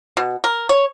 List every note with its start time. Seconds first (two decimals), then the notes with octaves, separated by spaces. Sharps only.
0.17 B2
0.44 A#4
0.69 C#5